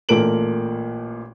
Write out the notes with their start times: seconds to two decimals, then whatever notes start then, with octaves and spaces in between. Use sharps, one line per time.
0.09 A1 A#2 A4 A#4 D7 F#7